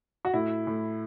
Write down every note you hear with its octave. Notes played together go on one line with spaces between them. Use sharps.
F#4
A2 E4
A2